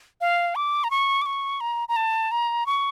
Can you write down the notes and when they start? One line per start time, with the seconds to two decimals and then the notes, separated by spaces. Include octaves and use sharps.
0.21 F5
0.55 D6
0.84 A#5
0.91 C#6
1.22 D6
1.26 C#6
1.61 A#5
1.88 A#5
1.96 A5
2.31 A#5
2.66 C#6